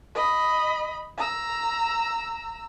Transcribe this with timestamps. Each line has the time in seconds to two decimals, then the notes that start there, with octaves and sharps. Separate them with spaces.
0.15 D#5 B5
1.17 A#5 E6